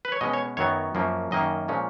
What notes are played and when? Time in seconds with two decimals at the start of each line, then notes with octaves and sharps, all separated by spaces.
0.05 B4
0.12 C#5
0.21 B2 G#3 C#4 D#5
0.33 C#5
0.57 F#2 D#3 F#3 B3 C#5
0.95 F#2 F3 A#3 C#4
1.31 F#2 D#3 A#3 C#4 D#5
1.68 A#2 F3 G#3 C#4